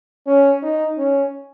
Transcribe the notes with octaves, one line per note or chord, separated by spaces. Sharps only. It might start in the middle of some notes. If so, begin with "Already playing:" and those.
C#4
D#4
C#4